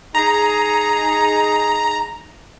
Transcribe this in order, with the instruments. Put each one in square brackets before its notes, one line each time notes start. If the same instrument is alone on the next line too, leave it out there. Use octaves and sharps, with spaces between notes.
[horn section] D#4 G#4 [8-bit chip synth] A#5